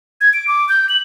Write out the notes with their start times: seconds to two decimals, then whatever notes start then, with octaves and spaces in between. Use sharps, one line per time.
0.21 G#6
0.34 D7
0.48 D6
0.69 G6
0.89 F#7